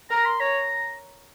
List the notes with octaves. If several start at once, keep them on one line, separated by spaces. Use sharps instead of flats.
A#4 A#5
C6
C#5 A#5